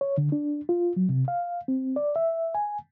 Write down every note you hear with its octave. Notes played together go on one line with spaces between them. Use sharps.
C#5
D3
D4
F4
F#3
C3
F5
C4
D5
E5
G#5